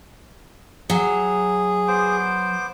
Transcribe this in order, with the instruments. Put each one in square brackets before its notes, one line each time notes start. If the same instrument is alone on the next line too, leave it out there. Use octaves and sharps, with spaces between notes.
[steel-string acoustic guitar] F#3 [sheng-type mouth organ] G#4
[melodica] B3 C5 D6